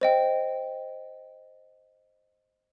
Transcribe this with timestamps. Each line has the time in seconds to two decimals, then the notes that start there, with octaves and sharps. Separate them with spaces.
0.01 C5 D#5 G5